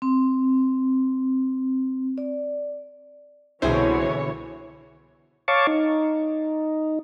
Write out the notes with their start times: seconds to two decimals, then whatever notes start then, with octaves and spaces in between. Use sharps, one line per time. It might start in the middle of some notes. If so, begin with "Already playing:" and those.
0.02 C4
2.18 D5
3.62 C2 B2 D3 E3 E4 G#4 C5 C#5
5.48 C#5 F5 A5 C#6 D6
5.67 D#4